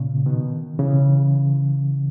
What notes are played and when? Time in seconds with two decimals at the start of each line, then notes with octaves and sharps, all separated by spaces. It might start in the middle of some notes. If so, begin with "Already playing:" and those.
Already playing: A#2 C#3
0.26 B2 D#3
0.79 C#3 E3